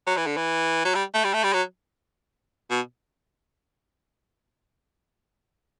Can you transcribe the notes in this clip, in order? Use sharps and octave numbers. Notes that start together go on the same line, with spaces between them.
F#3
E3
D3
E3
F#3
G3
A3
G3
A3
G3
F#3
B2